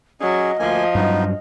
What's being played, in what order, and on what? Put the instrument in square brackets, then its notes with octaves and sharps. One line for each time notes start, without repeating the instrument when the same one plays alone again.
[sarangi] F#3 [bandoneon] C#4 G#4 [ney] D#5
[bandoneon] D2 A#3 G#5 [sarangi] F3
[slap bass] G2 F#3 [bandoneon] B3 D#4